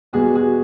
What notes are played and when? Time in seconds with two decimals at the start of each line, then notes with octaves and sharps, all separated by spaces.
0.13 E2 B2 G3 B3 F#4 G#4
0.35 F#4 G#4